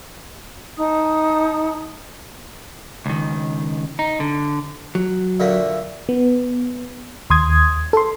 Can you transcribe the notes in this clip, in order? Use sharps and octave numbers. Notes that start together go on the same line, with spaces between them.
D#4 A5 D#6
C#2 D#3
D#4
D3
F#3
A#2 D3 A3
B3
D#2 C6 D#6 G#6
A4 C6